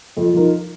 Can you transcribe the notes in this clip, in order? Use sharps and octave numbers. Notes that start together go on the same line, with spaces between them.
F2
F3 D#4 A#4